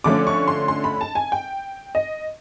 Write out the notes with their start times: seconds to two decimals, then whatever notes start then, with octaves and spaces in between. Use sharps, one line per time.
0.04 D3 F3 A3 C#4 D6
0.27 C#6
0.48 C6
0.68 C6
0.84 B5
1.01 A5
1.15 G#5
1.32 G5
1.95 D#5